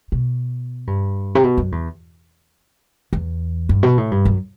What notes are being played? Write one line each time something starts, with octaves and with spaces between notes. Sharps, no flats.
B2
G2
C3
B2
F#2
E2
E2
G2
B2
A2
G2
F#2